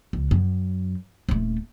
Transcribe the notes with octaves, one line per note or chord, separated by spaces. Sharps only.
C#2
F#2
D#1 A3